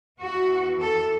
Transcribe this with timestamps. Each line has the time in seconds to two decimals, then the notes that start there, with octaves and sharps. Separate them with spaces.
0.20 E2 E3 F#4
0.80 A4